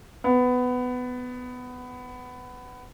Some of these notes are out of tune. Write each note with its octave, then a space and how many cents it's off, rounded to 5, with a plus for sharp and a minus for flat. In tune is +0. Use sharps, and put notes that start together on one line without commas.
B3 +15